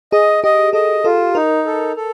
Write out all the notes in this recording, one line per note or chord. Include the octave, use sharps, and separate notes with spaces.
G#4 D#5
G4 D#5
A4 D#5
F4 A4
D#4 A#4
A4
A4